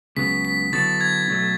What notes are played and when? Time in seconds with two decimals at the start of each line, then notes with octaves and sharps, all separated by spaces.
0.17 C#2 C#3 F#3 B3 B6
0.45 B6
0.72 D3 F#3 B3 E4 A4 A6
1.01 G#6
1.28 B1 B2 F#3 A3